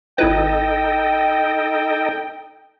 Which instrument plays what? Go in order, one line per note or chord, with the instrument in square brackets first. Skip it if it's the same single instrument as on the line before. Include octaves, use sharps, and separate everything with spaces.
[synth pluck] G#1 E4 B4 [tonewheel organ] D#4 A4 D#5 [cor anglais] G5